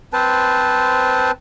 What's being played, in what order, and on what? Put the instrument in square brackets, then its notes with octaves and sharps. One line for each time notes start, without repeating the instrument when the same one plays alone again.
[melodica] C4 B4 C5 A5